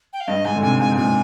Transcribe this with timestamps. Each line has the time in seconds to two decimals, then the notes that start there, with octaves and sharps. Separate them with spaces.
0.13 G5
0.20 F5
0.28 G2 D#5
0.45 G#2 G#5
0.55 D3
0.62 C3 G#5
0.79 G#2 G#5
0.92 G#2
0.97 A#2 G#5